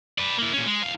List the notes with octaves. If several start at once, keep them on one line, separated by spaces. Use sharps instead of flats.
B4 D5
A#3 E4
A#2 C#4
G#3
E2 F5